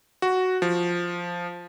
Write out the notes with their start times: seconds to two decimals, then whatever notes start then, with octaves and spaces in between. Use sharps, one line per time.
0.22 F#4
0.62 F3